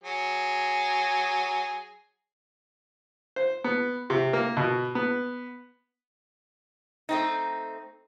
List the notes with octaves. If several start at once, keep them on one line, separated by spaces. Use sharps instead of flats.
F#3 G#4
C5
B3
C3
A#3
B2
B3
A3 C4 D#4